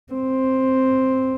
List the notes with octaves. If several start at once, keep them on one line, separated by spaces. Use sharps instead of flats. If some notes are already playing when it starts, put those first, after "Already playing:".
C4